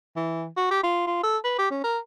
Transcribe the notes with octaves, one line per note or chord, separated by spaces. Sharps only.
E3
F#4
G4
F4
F4
A4
B4
G4
C#4
A#4